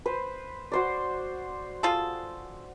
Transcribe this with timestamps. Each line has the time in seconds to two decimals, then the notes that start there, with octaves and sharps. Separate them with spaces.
0.06 B4 C5
0.72 F#4 C5 D5
1.83 F4 G#4 A4